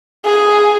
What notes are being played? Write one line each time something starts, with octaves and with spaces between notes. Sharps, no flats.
G#4